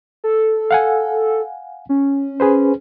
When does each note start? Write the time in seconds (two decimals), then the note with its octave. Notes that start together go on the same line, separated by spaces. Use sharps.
0.24 A4
0.71 F5 F#5 G#5
1.89 C#4
2.40 G#4 B4 C5